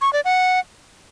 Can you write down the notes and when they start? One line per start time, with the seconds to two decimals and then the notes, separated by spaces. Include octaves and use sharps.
0.01 C#6
0.13 D5
0.25 F#5